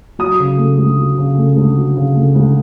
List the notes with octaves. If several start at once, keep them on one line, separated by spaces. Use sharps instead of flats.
F#3 D#6
C#3
A3
D2
F#3
C#3
A3
D2
F#3
C#3
A3
D2